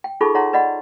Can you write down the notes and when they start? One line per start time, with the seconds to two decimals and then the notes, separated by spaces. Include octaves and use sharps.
0.04 G5
0.21 D#4 F4 G#4 A4 B5 C#6
0.35 D#4 C#5 E5 F#5 A#5 C6
0.53 B4 D5 D#5 F#5 B5